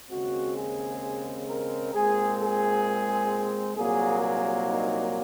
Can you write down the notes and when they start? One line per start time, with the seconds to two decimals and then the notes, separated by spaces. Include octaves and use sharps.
0.10 D#2 C#3 G#3 C4 F#4
0.56 G#4
1.47 A#4
1.93 A#2 G#3 C4 G#4
2.39 G#4
3.75 C2 A#2 F#3 A#3 G#4
4.21 G#4
4.66 D#4